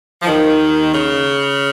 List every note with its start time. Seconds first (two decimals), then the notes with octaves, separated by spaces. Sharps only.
0.22 F3
0.26 D#2 D#3
0.94 C#3